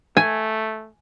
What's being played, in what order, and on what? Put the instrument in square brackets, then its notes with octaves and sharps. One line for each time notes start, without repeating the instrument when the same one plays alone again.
[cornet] A3 [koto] G#5